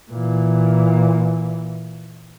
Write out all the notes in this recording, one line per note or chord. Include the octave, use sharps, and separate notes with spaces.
A#2 E3